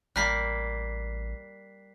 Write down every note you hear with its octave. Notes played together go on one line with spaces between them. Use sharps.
A1 G3 A#3 F#6 B6 C7